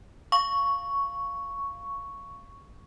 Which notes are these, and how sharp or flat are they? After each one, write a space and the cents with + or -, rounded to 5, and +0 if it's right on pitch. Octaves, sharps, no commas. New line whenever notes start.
F5 +0 C#6 +5